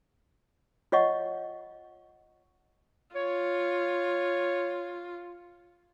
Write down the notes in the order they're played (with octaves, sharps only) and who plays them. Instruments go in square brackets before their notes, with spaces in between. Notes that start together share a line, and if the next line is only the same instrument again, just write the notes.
[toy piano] F4 C#5 D#5 F#5 C#6
[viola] F4 [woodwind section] C#5